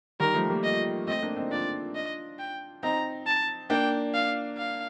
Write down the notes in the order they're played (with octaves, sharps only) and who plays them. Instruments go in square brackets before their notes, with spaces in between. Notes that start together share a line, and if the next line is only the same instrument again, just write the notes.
[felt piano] D#3 G3 [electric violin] A#4
[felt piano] F3 A3
G3 A#3
[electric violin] D#5
[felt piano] A3 C4 [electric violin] D#5
[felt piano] A#3 D4
C4 D#4
[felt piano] D4 F4 [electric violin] D5
[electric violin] D#5
G5
[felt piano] C4 D#4 [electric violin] A#5
[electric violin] A5
[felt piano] A#3 D4 [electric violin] G5
[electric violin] F5
F5